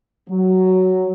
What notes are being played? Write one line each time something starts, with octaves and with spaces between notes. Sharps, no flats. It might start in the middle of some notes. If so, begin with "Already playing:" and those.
F#3